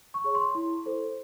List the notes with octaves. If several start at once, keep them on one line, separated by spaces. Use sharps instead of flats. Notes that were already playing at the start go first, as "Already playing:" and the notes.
C#6
G#4 C#5
C6
E4
A4 C5